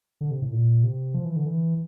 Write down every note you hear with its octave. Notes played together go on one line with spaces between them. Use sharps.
D3
C3
A2
A#2
C3
F3
E3
D3
E3